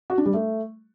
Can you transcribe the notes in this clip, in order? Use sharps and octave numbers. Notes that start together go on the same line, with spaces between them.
F#4
D4
G3
A3